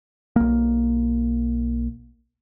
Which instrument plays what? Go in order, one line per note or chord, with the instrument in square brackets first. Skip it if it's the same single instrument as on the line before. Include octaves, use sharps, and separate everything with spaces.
[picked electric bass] B1 A#3